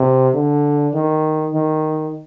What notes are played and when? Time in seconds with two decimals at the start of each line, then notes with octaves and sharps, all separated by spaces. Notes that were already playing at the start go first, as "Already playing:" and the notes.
Already playing: C3
0.34 D3
0.94 D#3
1.54 D#3